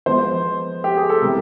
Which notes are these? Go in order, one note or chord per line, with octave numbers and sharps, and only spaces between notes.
F3 G#3 B3 C5
G4
G#4
A4
C3 E3 G3 B3 A#4